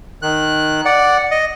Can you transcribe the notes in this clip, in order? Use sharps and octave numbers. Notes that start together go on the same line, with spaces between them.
D#3 F#6
D5 F#5
D#5